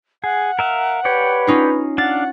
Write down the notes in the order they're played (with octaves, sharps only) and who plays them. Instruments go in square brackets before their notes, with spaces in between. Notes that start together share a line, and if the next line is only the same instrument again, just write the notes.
[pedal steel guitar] G#4 [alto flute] F#5
[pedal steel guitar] A#4 E5 F5
[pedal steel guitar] G4 C#5 D5 [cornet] B4
[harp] C#4 D#4 F4
[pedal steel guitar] D4 F5 [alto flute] F#5 [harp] A6